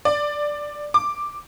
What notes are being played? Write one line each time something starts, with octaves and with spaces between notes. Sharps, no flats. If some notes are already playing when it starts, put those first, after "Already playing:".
D5
D6